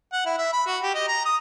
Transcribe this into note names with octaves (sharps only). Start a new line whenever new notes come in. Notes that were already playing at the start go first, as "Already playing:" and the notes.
F#5
E4
E5
B5
F#4
G4
D#5
A#5
D#6